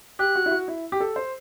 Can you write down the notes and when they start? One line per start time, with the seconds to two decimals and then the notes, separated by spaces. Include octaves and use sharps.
0.19 G4 F#6
0.35 F#4
0.46 E4
0.51 F#4
0.68 E4
0.92 G4
1.00 A4
1.16 C5